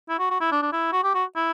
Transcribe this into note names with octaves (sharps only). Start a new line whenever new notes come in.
E4
F#4
F#4
E4
D4
D4
E4
F#4
G4
F#4
E4